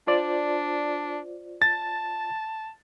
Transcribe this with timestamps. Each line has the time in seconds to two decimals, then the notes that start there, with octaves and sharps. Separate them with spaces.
0.07 D4 F4 C5 D5
1.62 A5 A6